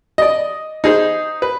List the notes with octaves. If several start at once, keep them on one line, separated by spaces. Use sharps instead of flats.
D5 D#5
D#4 G#4 C5
B4